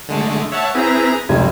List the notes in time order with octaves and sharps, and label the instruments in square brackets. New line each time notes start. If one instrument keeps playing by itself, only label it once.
[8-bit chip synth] D3 G#3 A3
[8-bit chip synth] C#5 F#5 A5 [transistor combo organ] E5
[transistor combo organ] C4 E4 B4 [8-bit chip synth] G#4 A#5
[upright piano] F1 C#2 [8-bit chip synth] F#2 [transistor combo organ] G#5